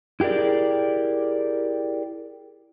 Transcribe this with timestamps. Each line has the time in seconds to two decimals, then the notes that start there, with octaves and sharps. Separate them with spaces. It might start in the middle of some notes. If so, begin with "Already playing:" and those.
0.20 E4 G4 G#4 A#4 D5